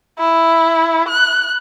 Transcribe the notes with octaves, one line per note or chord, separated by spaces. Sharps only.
E4
F#6